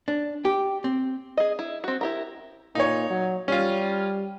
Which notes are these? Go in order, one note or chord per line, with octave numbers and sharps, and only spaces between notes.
D4
G4
C4
G#4 D#5
E4
C4 F#4
E4 G4 A#4
A#2 D#4 C#5
F#3
G3 C#4 F4